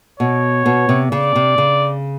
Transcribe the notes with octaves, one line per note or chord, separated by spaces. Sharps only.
B2 C#5
B2
C3
C#3 D5
C3
C#3